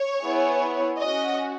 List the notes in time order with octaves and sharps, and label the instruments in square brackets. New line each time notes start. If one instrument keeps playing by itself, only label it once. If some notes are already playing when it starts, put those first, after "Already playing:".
Already playing: [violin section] C#5
B3 E4 G#4
C#4 F#4 D#5